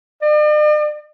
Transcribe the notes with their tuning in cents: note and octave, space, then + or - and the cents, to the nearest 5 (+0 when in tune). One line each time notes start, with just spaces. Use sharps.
D5 +45